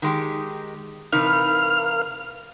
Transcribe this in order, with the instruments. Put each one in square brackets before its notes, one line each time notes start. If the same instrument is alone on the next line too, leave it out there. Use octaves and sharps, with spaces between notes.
[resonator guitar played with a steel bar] D#3 G#3 G4
[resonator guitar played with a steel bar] C3 E3 D#4 [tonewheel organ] A#4 F5 F6